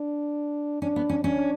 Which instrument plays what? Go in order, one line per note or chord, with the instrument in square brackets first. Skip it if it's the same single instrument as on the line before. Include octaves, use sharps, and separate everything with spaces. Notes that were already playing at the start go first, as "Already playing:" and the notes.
Already playing: [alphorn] D4
[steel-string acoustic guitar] C#4 [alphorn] D4
[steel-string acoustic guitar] B3
C#4
[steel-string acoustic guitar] C#4 [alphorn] D4